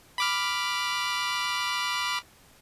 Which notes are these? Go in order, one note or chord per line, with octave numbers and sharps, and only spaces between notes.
B5 D6 F6